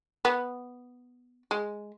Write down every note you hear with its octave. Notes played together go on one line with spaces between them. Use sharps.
B3
G#3